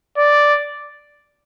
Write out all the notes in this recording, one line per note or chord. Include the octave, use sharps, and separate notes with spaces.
D5